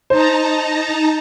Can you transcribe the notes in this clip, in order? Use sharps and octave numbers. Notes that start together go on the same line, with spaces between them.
D#4 C5 A5 A#5